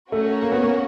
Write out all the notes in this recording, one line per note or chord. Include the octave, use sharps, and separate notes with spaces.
A3 C#4 F#4 A#4
A#3
B3
A#3